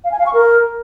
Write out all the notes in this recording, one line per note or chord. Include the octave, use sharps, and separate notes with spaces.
F5
G#5
F5
C#6
A#4